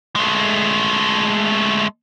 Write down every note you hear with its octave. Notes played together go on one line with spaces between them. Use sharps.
G#3 A3